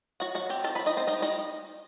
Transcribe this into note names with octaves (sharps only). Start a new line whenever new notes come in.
F#3 F#4 F#5
F#3 F#4 F#5
C4 G4 G5
D#4 A4 A5
B4 B5
F#3
D#4 D#5
F#3
C4 C5
G3 D#4 D#5
G3 D#4 D#5